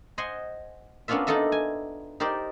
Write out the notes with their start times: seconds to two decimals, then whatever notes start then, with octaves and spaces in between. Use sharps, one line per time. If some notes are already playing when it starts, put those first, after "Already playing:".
0.18 C5 D#5 F#5 G#5 C6
1.08 A#3 B3 C#4 D4 F4 E5
1.27 D4 D#4 F4 A4 D#5 E5
1.52 G#5
2.20 D#4 G4 A#4 C5 D5